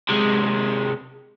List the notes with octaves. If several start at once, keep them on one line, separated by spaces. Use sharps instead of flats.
C3 G#3